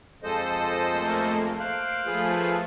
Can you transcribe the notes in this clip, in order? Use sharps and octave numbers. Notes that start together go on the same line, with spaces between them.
F2 F3 G#3 A4 C5 D#5
A3 A#3
C5 F5 F#6 D7
F3 A3 F4 G#4 B4